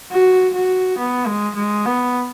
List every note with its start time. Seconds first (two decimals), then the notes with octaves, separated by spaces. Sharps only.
0.12 F#4
0.54 F#4
0.98 B3
1.26 G#3
1.55 G#3
1.85 B3